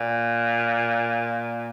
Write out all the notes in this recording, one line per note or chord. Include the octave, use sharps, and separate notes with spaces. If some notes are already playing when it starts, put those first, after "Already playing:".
Already playing: A#2